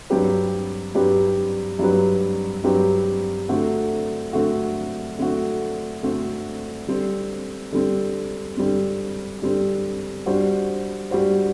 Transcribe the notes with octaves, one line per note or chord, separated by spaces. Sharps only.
G2 F#3 C4 G4 B4
G2 F#3 C4 G4 B4
G2 F#3 C4 G4 B4
G2 F#3 C4 G4 B4
D3 A3 C4 F#4
D3 A3 C4 F#4
D3 A3 C4 F#4
D3 A3 C4 F#4
D3 G3 C4
D3 G3 C4
D3 G3 C4
D3 G3 C4
G3 D4 F#4 C5
G3 D4 F#4 C5